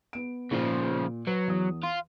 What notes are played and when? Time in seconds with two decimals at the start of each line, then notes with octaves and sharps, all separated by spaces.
0.13 B3 D7
0.52 A#2 C#3 F3
1.27 F#3 B4
1.48 E2 D#6
1.83 F4